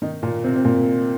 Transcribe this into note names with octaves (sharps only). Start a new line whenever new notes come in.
D#3 D#4
A#2 A#3
C3 C4
C4
A#2 A#3